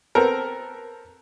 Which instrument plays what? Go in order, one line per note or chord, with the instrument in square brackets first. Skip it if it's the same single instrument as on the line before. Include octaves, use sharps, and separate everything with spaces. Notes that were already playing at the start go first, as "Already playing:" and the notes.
[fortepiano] B3 C4 A4 A#4